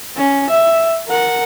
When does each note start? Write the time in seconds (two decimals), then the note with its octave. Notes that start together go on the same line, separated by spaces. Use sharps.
0.17 C#4
0.50 E5
1.09 A#4 F#5